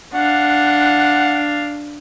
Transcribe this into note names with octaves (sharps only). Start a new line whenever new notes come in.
D4 F5 F#5